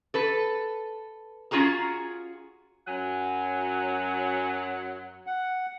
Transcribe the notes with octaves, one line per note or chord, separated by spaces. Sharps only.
A4 B4
C#4 F4 F#4 G#4 A#5
F#2 F#3 F#5 G#5
F#5